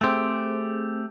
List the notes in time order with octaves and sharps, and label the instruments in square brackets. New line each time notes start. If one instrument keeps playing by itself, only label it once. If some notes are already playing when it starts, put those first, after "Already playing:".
[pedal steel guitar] A3 G4 [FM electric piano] C4 G#4